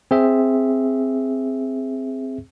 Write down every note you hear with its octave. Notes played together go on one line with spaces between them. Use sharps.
C4 G#4 E5